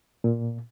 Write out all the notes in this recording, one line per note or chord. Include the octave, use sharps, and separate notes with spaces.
A#2